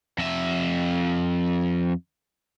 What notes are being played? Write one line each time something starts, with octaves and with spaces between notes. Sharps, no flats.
F2 E5